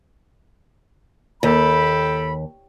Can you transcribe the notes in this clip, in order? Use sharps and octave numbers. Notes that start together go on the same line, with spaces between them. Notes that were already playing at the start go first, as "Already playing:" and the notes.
D#2 A4 G5 B5